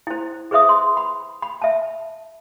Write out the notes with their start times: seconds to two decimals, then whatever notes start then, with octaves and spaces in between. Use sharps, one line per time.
0.07 E4 C5
0.51 G#4 B4 C5 E5 D#6
0.69 C6
0.97 B5
1.42 B5
1.62 E5 A5